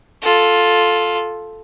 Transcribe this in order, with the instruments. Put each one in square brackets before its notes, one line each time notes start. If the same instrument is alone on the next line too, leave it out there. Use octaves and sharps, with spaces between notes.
[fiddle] F4 A4